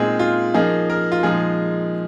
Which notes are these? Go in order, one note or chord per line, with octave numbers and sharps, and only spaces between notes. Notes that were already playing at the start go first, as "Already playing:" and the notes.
Already playing: A#2 G#3 C4 D#4 G#4
F4
F3 A#3 D#4 G#4
A#4
F4
A#2 F3 G#3 D#4 G#4